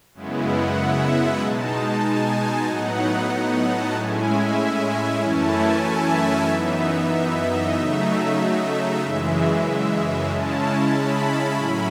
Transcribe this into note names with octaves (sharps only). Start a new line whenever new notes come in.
F#2 C#3 G#3 B3 E4
F#5
E5
B2 G#3 D#4 A5
A5
G#5
A2 F#3 B3 D#4 F#5
F#5
A5
A2 G#3 C#4 E4 G#5
E5
F#2 E3 A3 C#4 E4 A5
G#5
E5
F#2 E3 B3 D#4
E5
D#5
C#3 F#3 A3 D#4 E5
F#2 C#3 E3 G#3
C#3 G#3 C#4 E4 A5
B5
A2 F#3 C#4 E4